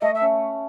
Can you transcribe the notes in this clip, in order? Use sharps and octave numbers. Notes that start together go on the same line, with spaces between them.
A3 D#5
E5
C#4